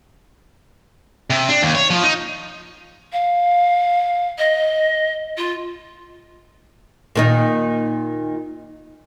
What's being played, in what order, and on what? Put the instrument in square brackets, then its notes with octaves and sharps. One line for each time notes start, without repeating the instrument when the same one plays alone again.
[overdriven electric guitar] C3
D4
D#2
C#5
F3
D#4
[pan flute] F5
D#5
F4
[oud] A#2 D#3 D#4